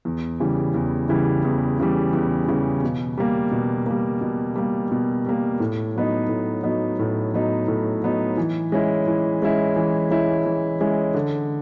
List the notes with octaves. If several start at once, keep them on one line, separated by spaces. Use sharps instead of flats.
E2
C#3 E3 G3
E2
C#3 E3 G3
E2
C#3 E3 G3
E2
C#3 E3 G3
B2
G3 A#3
B2
G3 A#3
B2
G3 A#3
B2
G3 A#3
A2
F#3 B3 D#4
A2
F#3 B3 D#4
A2
F#3 B3 D#4
A2
F#3 B3 D#4
E3
G#3 C#4 E4
E3
G#3 C#4 E4
E3
G#3 C#4 E4
E3
G#3 C#4 E4
D3